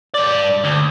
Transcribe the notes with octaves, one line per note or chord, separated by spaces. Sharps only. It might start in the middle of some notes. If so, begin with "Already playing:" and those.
G2 D5
D2